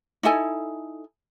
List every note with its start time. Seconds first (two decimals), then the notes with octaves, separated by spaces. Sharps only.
0.23 D#4 E4 A4 G#5